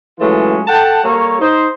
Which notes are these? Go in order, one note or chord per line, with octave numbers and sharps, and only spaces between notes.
E3 F#3 G#3 A3 C#4 F4
A4 F#5 G5 A5
G3 A#3 A4 C#5
D#4 C5